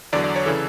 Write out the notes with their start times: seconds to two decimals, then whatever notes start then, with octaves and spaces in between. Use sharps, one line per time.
0.13 E2 D3 F#3 D5
0.24 D5
0.36 C#5
0.46 C#3 E3 A4